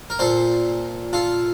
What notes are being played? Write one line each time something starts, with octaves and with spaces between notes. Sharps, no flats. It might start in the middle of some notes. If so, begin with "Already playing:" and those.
A#4
A#2 A4 C5
F4 A4